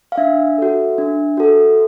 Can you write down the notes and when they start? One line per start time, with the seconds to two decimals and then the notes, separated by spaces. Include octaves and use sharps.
0.12 F5
0.18 D4 E5
0.58 F#4 A4
0.98 D4
1.37 F#4 A4